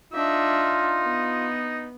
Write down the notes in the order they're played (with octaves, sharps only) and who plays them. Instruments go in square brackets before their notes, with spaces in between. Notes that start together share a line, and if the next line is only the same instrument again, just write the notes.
[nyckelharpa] D4 E5 [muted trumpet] D#4 [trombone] F4
[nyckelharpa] B3